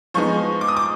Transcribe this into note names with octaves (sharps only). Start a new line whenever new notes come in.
F3 G#3 B3 D#4 C#6
D6
D#6
D6